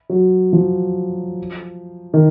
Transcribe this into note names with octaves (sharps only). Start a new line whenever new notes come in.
F#3
F3
D#3